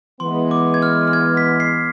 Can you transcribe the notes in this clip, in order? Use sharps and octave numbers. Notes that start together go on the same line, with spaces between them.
E3 G#3 B3 C6
D6
G#6
F6
F6
G#6
B6
C7